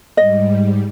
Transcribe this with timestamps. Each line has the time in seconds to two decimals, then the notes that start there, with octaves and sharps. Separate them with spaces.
0.17 G#2 G3 D#5